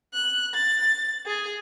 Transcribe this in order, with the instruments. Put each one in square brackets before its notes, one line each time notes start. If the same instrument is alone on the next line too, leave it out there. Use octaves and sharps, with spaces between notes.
[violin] F#6
A6
G#4